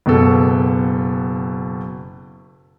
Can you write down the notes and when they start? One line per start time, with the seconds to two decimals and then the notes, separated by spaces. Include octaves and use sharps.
0.06 F#1 B2 A4